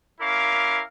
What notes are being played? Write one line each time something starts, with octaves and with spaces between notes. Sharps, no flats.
C#4 E4 A#4 F5 D6